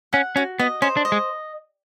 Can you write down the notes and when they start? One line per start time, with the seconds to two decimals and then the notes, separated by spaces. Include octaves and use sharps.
0.13 C#4 F#5
0.36 C#4 F#4
0.59 B3 D#5
0.82 C#4 C5
0.97 D4
1.05 D#5
1.12 G#3